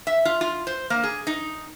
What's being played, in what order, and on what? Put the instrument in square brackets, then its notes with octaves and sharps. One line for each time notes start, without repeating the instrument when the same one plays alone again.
[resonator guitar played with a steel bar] E5
F4
F4
C5
A#3
G#4
D#4